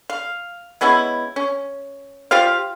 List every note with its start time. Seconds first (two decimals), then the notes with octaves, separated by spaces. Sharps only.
0.10 F5
0.81 G#3 B3 C#4 E4
1.36 C#4
2.31 F4 G4 C5 F5